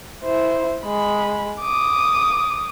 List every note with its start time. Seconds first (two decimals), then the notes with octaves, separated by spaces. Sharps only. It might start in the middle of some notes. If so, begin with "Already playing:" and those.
0.23 E4 C5
0.84 G#3 B5
1.61 D6 D#6